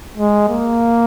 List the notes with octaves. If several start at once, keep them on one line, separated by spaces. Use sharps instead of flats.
G#3
A#3